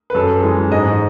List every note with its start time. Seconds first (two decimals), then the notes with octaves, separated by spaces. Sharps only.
0.10 B4
0.15 F#2 A4
0.43 E3 G#3
0.71 G#2 D#5